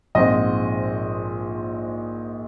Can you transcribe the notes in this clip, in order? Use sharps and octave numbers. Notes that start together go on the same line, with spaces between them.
A#1 G#2 F3 C4 D#5